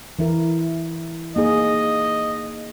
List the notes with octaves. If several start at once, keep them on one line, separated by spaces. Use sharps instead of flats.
E3 E4 A#4
A#3 D#4 G#4 D#5